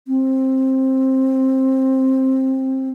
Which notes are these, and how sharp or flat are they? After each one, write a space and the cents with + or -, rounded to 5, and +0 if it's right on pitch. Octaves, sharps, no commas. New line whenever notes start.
C4 +15